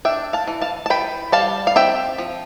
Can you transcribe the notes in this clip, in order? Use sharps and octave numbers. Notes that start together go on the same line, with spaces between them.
D4 E5 G5
F5 A5
E3
F5 A5
A5
E3 G5 B5
G3 F5 A5
F5
C4 E5 G5
F3